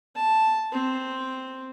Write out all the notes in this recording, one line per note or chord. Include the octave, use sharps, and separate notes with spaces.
A5
C4